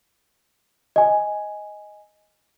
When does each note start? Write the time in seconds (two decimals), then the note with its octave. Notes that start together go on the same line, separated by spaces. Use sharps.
0.96 D#5 G#5